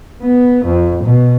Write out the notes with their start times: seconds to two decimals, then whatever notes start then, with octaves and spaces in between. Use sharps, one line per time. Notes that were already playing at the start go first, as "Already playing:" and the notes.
0.22 B3
0.65 F2
1.04 B2